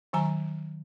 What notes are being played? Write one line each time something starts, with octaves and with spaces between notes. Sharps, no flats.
D#3 F#3 G#5 A#5